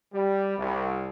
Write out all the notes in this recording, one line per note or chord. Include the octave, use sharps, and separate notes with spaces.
G3
C2